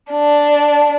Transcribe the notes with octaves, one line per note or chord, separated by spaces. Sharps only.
D4